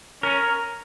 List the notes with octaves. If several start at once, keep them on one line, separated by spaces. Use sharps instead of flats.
C#4 A#4